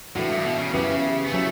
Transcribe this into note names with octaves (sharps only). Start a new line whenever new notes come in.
A2 E3 A3 D4 F#4
G2
B2
C#3
F#2 C#3 E3 B3 E4 G4
B3
C#3 F#3 A3 C#4 E4